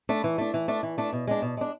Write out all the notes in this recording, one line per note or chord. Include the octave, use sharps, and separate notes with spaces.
A3 D4
E3
A3 D4
E3
A3 D4
E3
A3 D4
B2
G#3 D4
B2
G#3 D4